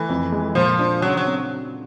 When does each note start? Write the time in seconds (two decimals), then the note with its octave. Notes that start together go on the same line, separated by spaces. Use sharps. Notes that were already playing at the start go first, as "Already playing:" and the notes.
Already playing: E3 A3
0.09 F2
0.32 G#3
0.55 A#2 F3
0.79 D4
1.02 C#3 F#3
1.17 F#3
1.25 C4